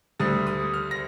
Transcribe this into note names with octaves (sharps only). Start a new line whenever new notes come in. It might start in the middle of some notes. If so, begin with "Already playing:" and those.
D2 D3 G3 D#6
D#6
F6
A#6